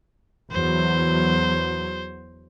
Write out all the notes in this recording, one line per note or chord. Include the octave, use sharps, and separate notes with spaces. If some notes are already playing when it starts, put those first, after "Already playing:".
E2 F#3 C5